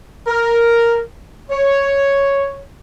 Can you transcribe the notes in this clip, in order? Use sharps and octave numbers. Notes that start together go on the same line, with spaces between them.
A#4
C#5